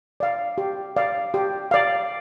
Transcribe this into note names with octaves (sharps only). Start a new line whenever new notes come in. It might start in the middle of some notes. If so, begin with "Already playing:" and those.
D5 F5
G4
D5 F5
G4
D5 F5